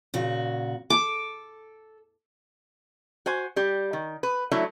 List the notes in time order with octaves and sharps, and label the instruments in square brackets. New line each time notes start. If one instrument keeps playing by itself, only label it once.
[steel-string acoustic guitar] A#2 C#3 F#4
[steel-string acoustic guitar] A4 [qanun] D6
[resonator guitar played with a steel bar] F#4 C5 G#5
G3 G4
D#3
B4
F#3 A3 D4 E4